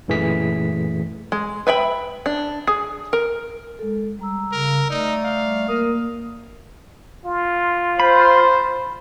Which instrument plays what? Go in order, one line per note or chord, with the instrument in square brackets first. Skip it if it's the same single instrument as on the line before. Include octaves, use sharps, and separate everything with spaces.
[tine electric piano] F#2 A#2 E3 A3 G#4 B6
[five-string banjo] G#3
B4 E5 G5 B5
D4
G#4
A#4
[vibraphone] G#3 A4
G3 A#5 E6
[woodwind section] C#3 [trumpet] A#4
[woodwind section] A3 D5 [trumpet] D#4
[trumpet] F5
[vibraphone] A#3 [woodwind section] A#4 D#6
[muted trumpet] F4
[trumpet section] C5 [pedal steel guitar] B5